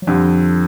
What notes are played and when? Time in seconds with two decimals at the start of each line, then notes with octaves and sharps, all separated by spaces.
0.02 F#3
0.07 F2 D3 F3 G3